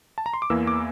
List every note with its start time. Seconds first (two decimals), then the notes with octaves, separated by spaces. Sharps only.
0.18 A5
0.26 A#5
0.34 C6
0.42 D6
0.50 E2 E3 A#3 E6
0.67 D6